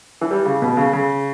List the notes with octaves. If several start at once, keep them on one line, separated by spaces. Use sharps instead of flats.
E3
G3
C#3
B2
C#3
C#3